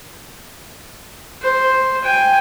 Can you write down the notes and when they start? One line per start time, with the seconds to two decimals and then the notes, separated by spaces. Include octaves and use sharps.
1.42 C5
2.04 G5 G#5